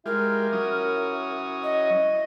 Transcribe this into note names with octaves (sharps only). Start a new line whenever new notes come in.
G#3 E4 F4 G4 A#4
F#3 C#4 D#6
D#5